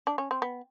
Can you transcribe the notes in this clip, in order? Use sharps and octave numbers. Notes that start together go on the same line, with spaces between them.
D4
C#4
C4
B3